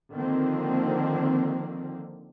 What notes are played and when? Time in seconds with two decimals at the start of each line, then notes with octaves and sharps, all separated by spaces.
0.13 D3 D#3 F3 A#3 C4